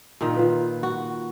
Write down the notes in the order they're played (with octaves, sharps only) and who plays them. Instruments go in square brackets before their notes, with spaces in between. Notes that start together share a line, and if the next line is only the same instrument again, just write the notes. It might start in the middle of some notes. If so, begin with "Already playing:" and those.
[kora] A#2 D#3
[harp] F4 B4
[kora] F#4